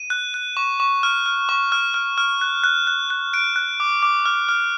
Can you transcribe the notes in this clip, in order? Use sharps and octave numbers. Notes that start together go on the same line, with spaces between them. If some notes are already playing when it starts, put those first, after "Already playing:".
Already playing: D#7
F#6
F#6
C#6
C#6
F6
F6
C#6
F6
F6
F6
F#6
F#6
F#6
F#6
F#6 D7
F#6
D6
D6
F6
F6